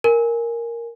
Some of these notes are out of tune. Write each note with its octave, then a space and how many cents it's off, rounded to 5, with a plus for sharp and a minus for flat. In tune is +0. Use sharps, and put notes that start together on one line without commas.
A#4 +0 G#5 +0